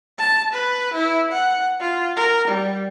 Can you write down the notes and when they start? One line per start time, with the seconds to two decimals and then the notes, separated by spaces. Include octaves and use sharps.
0.19 A5
0.53 B4
0.93 E4
1.32 F#5
1.80 F4
2.17 A#4
2.48 G3